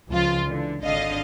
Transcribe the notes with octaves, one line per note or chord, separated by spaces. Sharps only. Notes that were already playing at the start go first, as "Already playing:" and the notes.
C#2 F3 F4
D3 E3
G#1 D3 D#5 F5